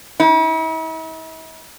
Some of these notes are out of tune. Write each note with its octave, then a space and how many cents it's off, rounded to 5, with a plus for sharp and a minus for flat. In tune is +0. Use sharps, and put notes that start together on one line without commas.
E4 -45